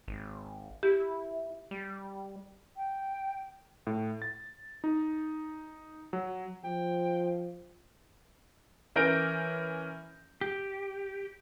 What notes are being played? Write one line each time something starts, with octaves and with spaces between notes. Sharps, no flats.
G#1
E4 G4
G3
G5
A2
A6
D#4
F#3
F3 G5
E3 C#4 A#4 G6 A#6 D7
G4